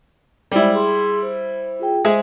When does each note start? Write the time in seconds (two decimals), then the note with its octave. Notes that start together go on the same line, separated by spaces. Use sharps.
0.52 G3 G#3 E4 C5 D5
0.73 G#4 C6
1.23 C5
1.79 F4 G#4 G5
2.05 G#3 G#4 C5 E5